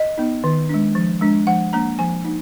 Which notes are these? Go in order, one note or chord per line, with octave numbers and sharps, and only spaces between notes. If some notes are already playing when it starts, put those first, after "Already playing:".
Already playing: D#5
B3 D#4
D#3
G#3 D4
F3
G#3 D4
F3 F#5
A#3 D4 A#5
F3 G#5
A#3 D#4